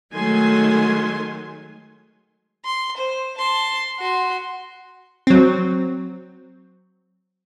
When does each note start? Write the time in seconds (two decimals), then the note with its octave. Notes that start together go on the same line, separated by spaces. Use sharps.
0.14 D#3 F#3 G#3 A3 G#5 C6
2.65 C6
2.97 C5
3.38 A5 C6
3.99 F#4 C6
5.27 F#3 C4